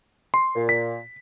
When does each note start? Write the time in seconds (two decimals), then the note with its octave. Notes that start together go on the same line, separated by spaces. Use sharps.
0.34 C6
0.55 A#2
0.69 B6